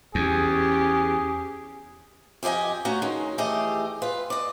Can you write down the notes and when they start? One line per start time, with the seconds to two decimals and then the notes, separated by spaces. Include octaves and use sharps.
0.15 E2 C#4 G4 G#4
2.43 F2 G4 G#4 D#5 G#5
2.85 A3 C#4 F#4 F5 A#5
3.02 D#3 G#3 C#4
3.38 E3 A3 G4 G#4 D#5
4.02 F4 B4
4.30 D5 D#5